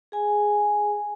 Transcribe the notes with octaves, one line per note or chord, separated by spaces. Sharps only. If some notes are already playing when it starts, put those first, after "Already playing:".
G#4 G#5